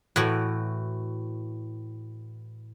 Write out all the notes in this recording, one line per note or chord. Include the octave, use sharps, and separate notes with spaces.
A2 E3 F#4